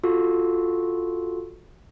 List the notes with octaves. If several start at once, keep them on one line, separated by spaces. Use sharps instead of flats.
F4 F#4 A4